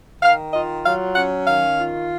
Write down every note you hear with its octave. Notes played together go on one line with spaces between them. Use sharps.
D#3 F5
F4 D#5
F#3 F5
C#4 F#5
D#3 F5
F4